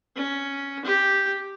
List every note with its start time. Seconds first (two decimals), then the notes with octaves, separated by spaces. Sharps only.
0.16 C#4
0.85 G4